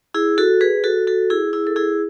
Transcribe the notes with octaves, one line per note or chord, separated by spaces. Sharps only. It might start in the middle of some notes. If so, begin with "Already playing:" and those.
E4 G#4
F#4 A4
G#4 B4
F#4 A4
F#4 A4
E4 G#4
E4 G#4
A4
E4 G#4